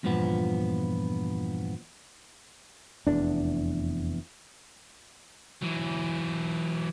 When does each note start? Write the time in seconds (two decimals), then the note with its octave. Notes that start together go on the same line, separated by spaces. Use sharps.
0.03 E2 G2 A#2 F3 B3
3.07 F1 E2 D4
5.62 E3 F#3